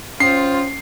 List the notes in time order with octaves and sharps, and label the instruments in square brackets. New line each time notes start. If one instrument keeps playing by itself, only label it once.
[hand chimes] C#4 [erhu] F4 [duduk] C5 [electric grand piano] C7